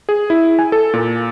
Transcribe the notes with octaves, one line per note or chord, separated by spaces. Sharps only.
G#4
E4
G#5
A4
A#2